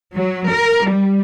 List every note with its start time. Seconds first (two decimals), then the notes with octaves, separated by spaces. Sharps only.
0.13 F#3
0.47 A#4
0.84 G3